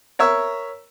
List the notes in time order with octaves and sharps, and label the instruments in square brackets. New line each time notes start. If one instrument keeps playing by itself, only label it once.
[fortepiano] A#4 C#5 E5 E6